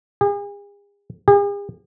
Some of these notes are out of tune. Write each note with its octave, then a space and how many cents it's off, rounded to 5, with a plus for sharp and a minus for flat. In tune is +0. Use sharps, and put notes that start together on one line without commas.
G#4 -40
G#4 -45